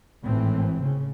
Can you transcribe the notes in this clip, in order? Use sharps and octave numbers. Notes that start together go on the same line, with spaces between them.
G#1 A2 E3 C4
C#3